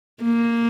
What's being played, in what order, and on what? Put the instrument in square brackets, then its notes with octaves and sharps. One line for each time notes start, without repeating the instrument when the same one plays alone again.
[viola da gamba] A#3